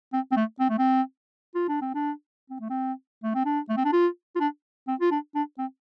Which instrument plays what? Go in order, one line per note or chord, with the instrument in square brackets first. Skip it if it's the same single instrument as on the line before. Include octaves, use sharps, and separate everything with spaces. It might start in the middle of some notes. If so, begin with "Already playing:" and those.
[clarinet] C4
C4
A3
C4
A3
C4
F4
D4
C4
D4
C4
A3
C4
A3
C4
D4
A3
C4
D4
F4
F4
D4
C4
F4
D4
D4
C4